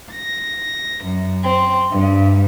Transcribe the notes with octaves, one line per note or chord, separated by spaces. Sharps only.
A#6
F#2
C4
G2